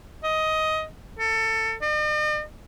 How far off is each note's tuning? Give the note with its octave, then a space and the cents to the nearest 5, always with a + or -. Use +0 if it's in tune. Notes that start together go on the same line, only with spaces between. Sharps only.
D#5 +15
A4 +20
D#5 -45